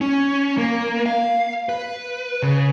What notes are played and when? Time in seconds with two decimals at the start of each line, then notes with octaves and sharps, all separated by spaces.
0.01 C#4
0.58 A#3
1.06 F5
1.69 B4
2.42 C#3